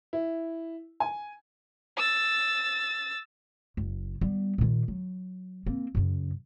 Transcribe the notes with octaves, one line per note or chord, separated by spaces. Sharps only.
E4
G#5
E6 A6
F#1
G3 B3
A#2 D#3
F#3
A#3 C4
F#2 C#3